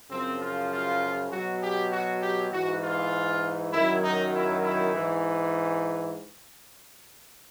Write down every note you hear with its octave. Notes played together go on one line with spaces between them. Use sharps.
F#2 C#3 F3 C4
F4
F4
B2 F#3 F#4
G4
F#4
G4
G#2 E3 F#4
F4
F#2 D#3 F#3 E4
D#4
E4
E4
G#2 E3